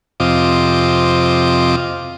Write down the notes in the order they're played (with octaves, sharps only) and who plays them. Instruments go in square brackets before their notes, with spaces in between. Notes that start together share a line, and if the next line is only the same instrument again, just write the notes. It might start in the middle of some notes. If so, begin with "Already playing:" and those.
[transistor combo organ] F2 C3 F4 D#5 D6